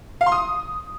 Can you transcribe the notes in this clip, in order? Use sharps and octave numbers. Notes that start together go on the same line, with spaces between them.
F5
C6
D#6